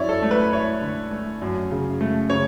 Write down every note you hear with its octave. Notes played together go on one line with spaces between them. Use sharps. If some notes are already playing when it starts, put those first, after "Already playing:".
Already playing: F#2 E4 C#5 D5
A4
A3
B4
E4 C#5
D3
A3
F#2
C#3
A3
C#3 C#5